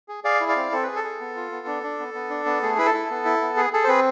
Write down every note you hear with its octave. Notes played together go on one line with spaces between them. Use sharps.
G#4
G#4 D5 F5
E4
D5 F5
C4
C4 A4
G#4 B4
A4
G#4
B3
F4
B3
D4
D4
B3
B3
D4
B3
A3 G#4
E4 B4
A4
E4
B3
E4
B3
G#4
G#4 A4
C5
C4 G#4 B4